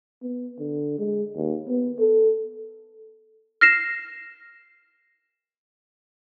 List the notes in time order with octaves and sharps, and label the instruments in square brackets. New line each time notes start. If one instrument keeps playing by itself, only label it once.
[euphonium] B3
D3
G#3
D#2
B3
A4
[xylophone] F6 A#6 C7 E7